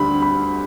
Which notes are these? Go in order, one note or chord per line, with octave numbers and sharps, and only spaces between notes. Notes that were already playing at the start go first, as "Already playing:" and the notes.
Already playing: D2 D3 G3 B5
B5